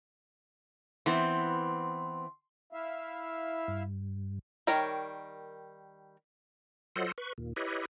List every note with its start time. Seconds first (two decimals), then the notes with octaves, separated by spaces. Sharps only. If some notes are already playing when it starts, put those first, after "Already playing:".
1.06 E3 B3 C4 C6
2.73 E4 E5 F5
3.68 G2
4.67 D#3 G3 A#4 C#5
6.96 F#3 F4 A4 C5 D#5 F#5
7.18 B4 C#6
7.38 D#2 A#2
7.56 E4 G4 B4 C#5 D#5